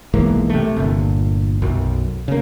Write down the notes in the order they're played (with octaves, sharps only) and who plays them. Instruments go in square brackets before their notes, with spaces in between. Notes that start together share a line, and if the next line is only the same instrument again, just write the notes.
[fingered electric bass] B1 G#2 E3 A#3
C3 A3
G1 A#2
B1 F#2
C#3 A#3